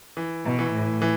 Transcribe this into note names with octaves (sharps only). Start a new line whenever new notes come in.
E3
B2
E3
A2
E3